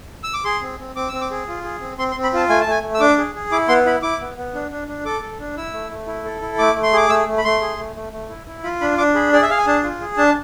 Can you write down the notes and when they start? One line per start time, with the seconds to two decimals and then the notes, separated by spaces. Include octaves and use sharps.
0.24 E6
0.34 D6
0.45 G#4 C6
0.62 C4
0.79 C4
0.96 C4 D6
1.09 C4 E6
1.21 D6
1.31 G#4
1.48 F4
1.64 G#4
1.81 C4
1.98 C4 C6
2.11 C6
2.16 C4
2.23 B5
2.33 F4 A5
2.49 A3 G#5
2.61 A5
2.67 A3 G#5
2.83 A3
2.95 E6
3.00 D4 D6
3.18 G#4
3.35 G#4
3.52 E4 D6
3.68 B3 C6
3.85 E4 B5
4.03 E4 D6
4.21 B3
4.37 B3
4.54 D4
4.71 D4
4.88 D4
5.05 A4 D6
5.22 A4
5.39 D4
5.57 E4 E6
5.74 A3
5.91 A3
6.07 E4
6.25 A4
6.42 E4
6.59 A3 D6
6.76 A3
6.83 C6
6.93 G#4 D6
7.10 A3 E6
7.28 A3
7.38 B5
7.45 A3 C6
7.61 G#4
7.78 A3
7.96 A3
8.13 A3
8.29 E4
8.47 E4
8.63 F4 B5
8.81 D4 B5
8.98 D4 D6
9.15 G#4 B5
9.33 G#4 D5
9.42 E5
9.49 G#4 F5
9.58 G#5
9.67 D4 A5
9.83 F4
10.01 G#4
10.17 D4 A5